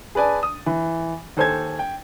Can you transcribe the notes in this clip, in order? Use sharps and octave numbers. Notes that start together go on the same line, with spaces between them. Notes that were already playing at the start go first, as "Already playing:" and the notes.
G#4 B4 D5 G#5 A5
D#6
E3
D#2 A4 C5 G#5 G#6
G5